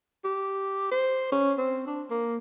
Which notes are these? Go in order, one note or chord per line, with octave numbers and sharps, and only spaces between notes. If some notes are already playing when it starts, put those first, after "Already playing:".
G4
C5
C#4
C4
D4
A#3